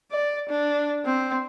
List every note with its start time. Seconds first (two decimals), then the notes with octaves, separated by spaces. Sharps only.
0.12 D5
0.50 D4
1.05 C4